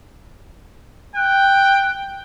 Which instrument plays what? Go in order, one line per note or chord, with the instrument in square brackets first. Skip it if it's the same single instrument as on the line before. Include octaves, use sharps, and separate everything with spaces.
[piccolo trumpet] G5 [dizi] F#6